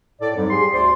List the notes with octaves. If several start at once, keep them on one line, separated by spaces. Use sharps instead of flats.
A2 A4 D5
F2 G#2 F#3 G3
G4 G#4 C6
D2 C5 D5 C6